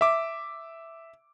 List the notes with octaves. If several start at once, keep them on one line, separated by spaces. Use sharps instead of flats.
E5 D6